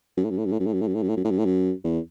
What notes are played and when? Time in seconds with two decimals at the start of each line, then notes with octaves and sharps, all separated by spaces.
0.17 F#2
0.24 A2
0.30 F#2
0.38 A2
0.46 F#2
0.52 A2
0.60 F#2
0.66 A2
0.73 F#2
0.81 A2
0.87 F#2
0.94 A2
1.02 F#2
1.09 A2
1.17 F#2
1.24 A2
1.31 F#2
1.38 A2
1.45 F#2
1.84 E2